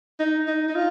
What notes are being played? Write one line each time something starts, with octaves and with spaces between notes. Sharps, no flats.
D#4
D#4
D#4
F4